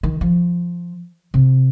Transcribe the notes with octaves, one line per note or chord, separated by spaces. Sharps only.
D#3
F3
C3